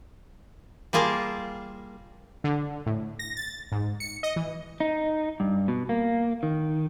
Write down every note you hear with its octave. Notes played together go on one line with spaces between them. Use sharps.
G3 A#3 F4 G#4 A#4 A5
D3
A2
A#6
A6
G#2
C#7
D#5
E3
D#4
G2
B2
A#3
D#3